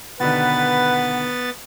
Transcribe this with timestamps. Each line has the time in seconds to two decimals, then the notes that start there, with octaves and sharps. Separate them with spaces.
0.20 B2 D3 D#3 B3 B4 F#5 A6